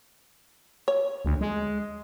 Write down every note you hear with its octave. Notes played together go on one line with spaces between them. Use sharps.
C#5
D2
G#3